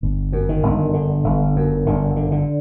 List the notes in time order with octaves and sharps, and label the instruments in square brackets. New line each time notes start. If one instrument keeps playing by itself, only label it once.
[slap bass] G1
F#2
D#3
G1
D3
G1
F#2
G1 D3
D3
D3